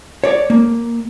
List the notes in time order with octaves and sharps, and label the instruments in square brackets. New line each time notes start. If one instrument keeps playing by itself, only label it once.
[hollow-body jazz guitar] C#5 D5
A#3